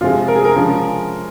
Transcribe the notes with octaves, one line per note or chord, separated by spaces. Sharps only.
F2 C3 F3 G#3 C4 F4
A#4
G#4
A#4
C#3 F3 G#3 C#4